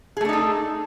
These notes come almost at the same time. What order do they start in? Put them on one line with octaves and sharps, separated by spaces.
G#4 A3 D4 D#4 A4